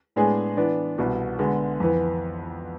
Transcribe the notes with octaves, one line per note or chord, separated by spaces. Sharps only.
A2 G#3 B3 D4 G#4
E3 B3 D4
C2 B2 B3
D3 G#3 B3
F2 E3 B3